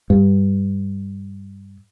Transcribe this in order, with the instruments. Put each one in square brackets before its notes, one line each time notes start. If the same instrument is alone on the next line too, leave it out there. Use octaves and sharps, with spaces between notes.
[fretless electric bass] G2